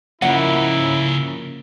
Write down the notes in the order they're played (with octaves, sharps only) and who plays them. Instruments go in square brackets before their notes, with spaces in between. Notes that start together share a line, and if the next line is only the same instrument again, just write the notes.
[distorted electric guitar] C#3 D#4 [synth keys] F3 A#3 C#4 [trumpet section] E4 [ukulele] F#5